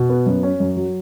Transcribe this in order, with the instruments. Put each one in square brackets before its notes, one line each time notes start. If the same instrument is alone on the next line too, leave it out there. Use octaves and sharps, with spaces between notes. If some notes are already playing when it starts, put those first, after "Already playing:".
Already playing: [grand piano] B2
B3
F#2
C#4
F#2
F#3